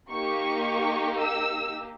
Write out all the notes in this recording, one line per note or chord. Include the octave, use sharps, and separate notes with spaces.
A#3 D#4 G4 C#6
E6